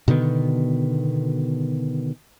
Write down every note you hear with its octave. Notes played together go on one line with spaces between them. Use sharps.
B2 D3 D#3 B3